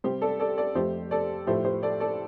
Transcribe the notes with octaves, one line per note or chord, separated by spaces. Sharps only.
C3 G3 G4 C5
A4 D5
A4 D5
A4 D5
F2 F3 A3 G4 C5
A4 D5
A2 F3 A3 G4 C5
G4 C5
A4 D5
A4 D5